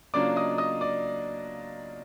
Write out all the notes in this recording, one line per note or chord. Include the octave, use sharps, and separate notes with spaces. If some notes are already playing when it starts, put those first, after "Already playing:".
C#3 F#3 A#3 D4 F4 D5 D6
D#5 D#6
D#5 D#6
D5 D6